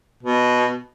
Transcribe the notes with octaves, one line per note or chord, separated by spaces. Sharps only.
B2